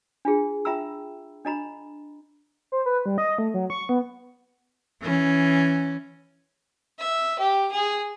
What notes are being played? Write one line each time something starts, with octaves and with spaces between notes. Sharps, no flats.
D4 F4 G#4
F4 E5 G5 A#5 B5 E6
D4 D#5 A#5 B5
C5
B4
G3
D#5
A3
F#3
C#6
B3
E3 C#4
E5
G4
G#4